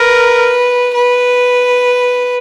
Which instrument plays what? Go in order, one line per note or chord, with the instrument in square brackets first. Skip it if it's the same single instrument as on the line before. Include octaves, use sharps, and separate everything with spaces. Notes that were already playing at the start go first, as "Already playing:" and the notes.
Already playing: [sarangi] A#4 [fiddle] B4
[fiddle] B4